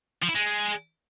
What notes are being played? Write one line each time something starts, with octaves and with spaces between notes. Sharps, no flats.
F3
E4
G#3